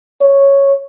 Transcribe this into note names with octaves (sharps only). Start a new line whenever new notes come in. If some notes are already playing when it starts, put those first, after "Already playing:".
C#5